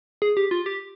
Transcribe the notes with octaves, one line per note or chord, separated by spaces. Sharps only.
G#4
G4
F4
G4